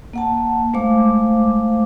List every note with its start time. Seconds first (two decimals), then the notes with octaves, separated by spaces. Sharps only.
0.13 A#3 F#5 A5
0.74 G#3 A3 C5 F5 D6